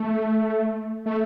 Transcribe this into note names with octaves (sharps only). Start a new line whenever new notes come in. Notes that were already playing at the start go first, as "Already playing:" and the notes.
Already playing: A3
A3